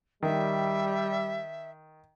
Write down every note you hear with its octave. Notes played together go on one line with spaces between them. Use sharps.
D#3 G3 E5